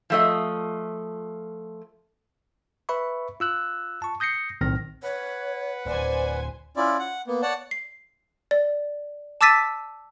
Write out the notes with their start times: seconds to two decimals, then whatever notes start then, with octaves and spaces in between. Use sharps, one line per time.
0.10 F3 A3 D#5
2.89 B4 E5 B5 C#6
3.40 F4 E6 F#6
4.02 A5 C#6
4.20 D#6 G6 A#6 C7 C#7
4.61 B1 A2 D#3 C4 F6 A#6
5.03 B4 C#5 F#5
5.86 D1 C5 D5 G#5
6.77 C#4 E4 F4 D5
6.99 F#5
7.27 A#3 B3
7.42 C#5 D5 F#5 A5
7.71 C7
8.51 D5
9.41 A5 D6 E6 A6 B6 D#7